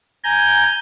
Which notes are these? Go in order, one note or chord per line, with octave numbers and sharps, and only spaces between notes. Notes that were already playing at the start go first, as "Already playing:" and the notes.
G#5 A#5 G6